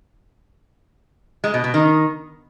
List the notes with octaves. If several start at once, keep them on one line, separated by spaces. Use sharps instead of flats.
G#3
B2
B2
D#3